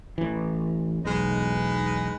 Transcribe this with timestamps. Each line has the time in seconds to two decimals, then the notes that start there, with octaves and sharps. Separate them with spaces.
0.18 A1 E3
1.05 E1 B1 G#3 D#4 B4